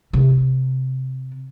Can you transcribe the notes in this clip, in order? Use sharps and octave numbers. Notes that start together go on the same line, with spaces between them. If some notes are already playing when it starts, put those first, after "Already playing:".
C3